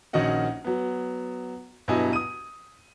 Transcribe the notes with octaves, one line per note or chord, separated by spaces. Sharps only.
A#1 D#3 C#4 F#4 D#5 F#5
F#3 B3
G2 B2 F#3 E4 D#5 G#5
D#6 D#7